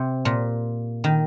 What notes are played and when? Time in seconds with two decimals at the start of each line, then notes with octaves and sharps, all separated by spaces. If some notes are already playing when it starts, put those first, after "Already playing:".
Already playing: C3
0.25 A#2
1.04 D#3